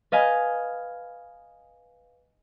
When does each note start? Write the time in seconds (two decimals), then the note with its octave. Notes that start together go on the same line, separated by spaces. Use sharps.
0.12 B4 D#5 F5 G#5